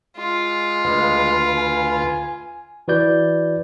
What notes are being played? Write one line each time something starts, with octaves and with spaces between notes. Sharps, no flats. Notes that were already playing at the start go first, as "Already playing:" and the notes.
G#3 F4
D2 G#3 B4 F5
G#5
E3 F#4 B4 D5 G6